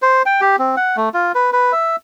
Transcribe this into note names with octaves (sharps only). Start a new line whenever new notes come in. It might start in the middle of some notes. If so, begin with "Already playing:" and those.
C5
G5
G4
C4
F#5
A3
F4
B4
B4
E5